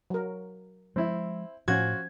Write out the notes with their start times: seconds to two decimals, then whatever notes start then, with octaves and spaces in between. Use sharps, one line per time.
0.10 F#3 A#4
0.96 F3 G#3 C4 E4
1.68 A2 F3 C#4 F4 F#4 G#6